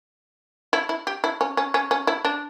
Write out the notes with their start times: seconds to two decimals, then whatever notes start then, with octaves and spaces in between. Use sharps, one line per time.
0.73 E4
0.89 E4
1.07 G4
1.24 E4
1.41 C#4
1.57 C#4
1.74 C#4
1.91 C#4
2.07 E4
2.25 D4